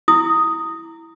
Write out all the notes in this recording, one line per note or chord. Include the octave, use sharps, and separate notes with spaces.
E4 D#6